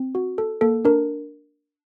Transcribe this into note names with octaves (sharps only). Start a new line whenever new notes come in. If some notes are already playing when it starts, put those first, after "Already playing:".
Already playing: C4
F#4
A4
A#3 A4
D4 A#4